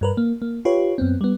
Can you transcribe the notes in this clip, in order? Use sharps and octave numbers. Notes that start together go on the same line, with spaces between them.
G2 A#4 B4
A#3
A#3
F4 G4 B4 C#5
F#2 B3 C4
G3 B3